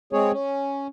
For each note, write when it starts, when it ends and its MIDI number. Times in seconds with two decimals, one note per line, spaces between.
0.13 0.32 56
0.13 0.32 60
0.13 0.32 68
0.13 0.32 73
0.32 0.87 61